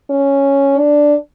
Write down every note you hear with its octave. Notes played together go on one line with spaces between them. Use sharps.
C#4
D4